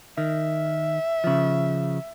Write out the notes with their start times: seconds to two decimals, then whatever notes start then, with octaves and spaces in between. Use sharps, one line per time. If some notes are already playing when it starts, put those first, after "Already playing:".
0.18 D#3 E5
1.24 C#3 F3